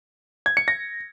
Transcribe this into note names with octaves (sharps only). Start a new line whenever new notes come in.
G#6
C#7
A#6